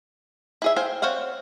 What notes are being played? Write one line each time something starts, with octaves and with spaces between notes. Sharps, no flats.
E4 G#4 E5
C5 F5 G5 G#5
C4 C5 C#5 F5 F#5